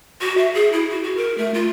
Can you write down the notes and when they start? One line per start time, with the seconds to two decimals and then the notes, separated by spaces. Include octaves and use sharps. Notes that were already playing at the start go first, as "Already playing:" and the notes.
0.21 F#4
0.38 E5
0.54 G#4
0.73 E4
0.91 F#4
1.03 F#4
1.17 A#4
1.38 A3
1.54 F4